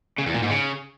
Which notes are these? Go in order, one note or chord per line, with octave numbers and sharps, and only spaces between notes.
C#3
E2
A#2
G#2
C#3